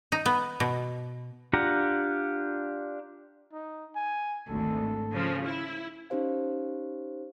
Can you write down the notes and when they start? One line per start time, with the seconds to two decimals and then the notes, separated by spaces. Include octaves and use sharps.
0.12 D#4
0.26 B3
0.60 B2
1.53 D4 F4 G4 F#5 A#5
3.53 D#4
3.95 G#5
4.49 G#1 D2 A4
5.11 C#3 F3
5.46 E4
6.10 C#4 D#4 G4 C5 F5